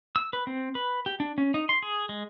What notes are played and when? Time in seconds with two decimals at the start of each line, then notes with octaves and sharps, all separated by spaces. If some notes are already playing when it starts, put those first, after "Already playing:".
0.16 E6
0.33 B4
0.47 C4
0.75 B4
1.06 G4
1.20 D4
1.38 C#4
1.54 D#4
1.69 C6
1.82 G#4
2.09 G#3